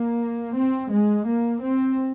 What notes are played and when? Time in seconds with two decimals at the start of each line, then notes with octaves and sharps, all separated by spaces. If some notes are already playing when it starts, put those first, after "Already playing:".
Already playing: A#3
0.56 C4
0.91 G#3
1.27 A#3
1.63 C4